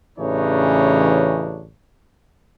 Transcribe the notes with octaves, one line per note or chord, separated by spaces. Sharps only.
A1 C#3 E3 D4 D#4 C#5